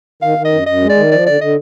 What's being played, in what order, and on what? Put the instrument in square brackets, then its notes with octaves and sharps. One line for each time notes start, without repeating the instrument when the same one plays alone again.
[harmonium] D#3 [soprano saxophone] F5
[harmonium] D#3
[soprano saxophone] D#5
[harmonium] F#2
[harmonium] F#2 [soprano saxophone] D#5
[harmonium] G#3
[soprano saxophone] D5
[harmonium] D#3
[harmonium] F3 [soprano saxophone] D5
[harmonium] D3 [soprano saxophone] D5
[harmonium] D3 [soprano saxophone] D#5